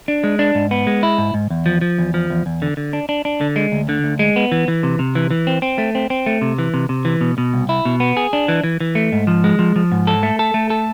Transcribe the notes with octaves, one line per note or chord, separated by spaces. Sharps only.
D4
G#3
D4
G#2
B3
G#3
E4
G#2
G#2
E2
F3
F3
E2
F3
E2
E2
D3
D3
D4
D4
D4
D3
G#3
D2
D3
D2
G#3
B3
E3
E3
C3
C3
E3
E3
C4
C4
A3
C4
C4
A3
C3
E3
C3
C3
E3
B2
B2
C2
E4
B2
B3
G#4
D4
E3
E3
E3
A3
G#2
F3
G#3
F3
F3
G#2
A4
A3
A4
A3
A4